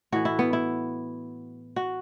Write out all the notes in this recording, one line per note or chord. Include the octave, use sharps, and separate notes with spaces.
A2 E3 F#4
E4
B3
E4
F#4